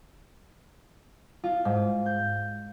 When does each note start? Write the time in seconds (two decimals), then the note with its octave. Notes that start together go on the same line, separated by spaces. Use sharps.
1.44 F4
1.65 G#2
2.06 G6